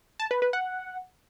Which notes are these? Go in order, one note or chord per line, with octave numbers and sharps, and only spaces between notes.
A5
B4
B4
F#5